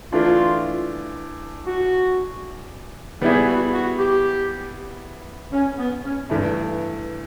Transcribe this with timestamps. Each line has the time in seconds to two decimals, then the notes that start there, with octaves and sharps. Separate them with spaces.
0.13 E3 A3 D4 F4
1.67 F#4
3.21 G3 B3 E4 G4 G#4
3.47 F#4
3.73 F#4
3.99 G4
5.53 C#4
5.79 B3
6.04 C#4
6.30 G2 E3 A3